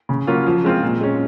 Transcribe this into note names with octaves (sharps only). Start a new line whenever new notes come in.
C#3
F#3 A#3 C#4 F4
F3
G#3 C4 F4
A#2
G#3 C#4